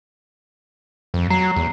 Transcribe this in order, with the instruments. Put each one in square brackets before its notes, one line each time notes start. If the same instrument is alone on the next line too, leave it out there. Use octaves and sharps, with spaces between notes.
[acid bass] F2
[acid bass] F#3 [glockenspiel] A#5 C7
[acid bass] E2